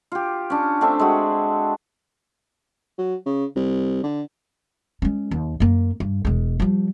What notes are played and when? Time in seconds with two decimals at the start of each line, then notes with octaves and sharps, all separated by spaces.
0.12 F4 G4
0.50 C#4 D4
0.81 A3 C4 D4 E5
0.99 G#3 F#4
2.98 F#3
3.26 C#3
3.56 C2
4.03 D3
5.02 G#3 C#4
5.31 D#2
5.60 F#2 A#3
6.00 G2
6.25 E1 G#3
6.60 F3 G3